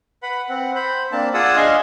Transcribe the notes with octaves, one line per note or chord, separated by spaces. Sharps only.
B4 F#5 B5
C4 F#5
C5 B5
A#3 C4 D4 A5
F4 G#4 D5 F#5 D#6 E6
D4 D#5 F5 G#5 C6